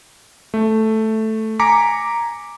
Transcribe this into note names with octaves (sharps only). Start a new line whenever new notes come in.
A3
G#5 A#5 D6 B6 C#7